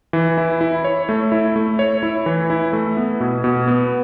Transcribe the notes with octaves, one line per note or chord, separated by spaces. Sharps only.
E3
E4
E4
C#5
A3
E4
A3
C#5
E4
E3
E4
A3
B3
B2
B2
B3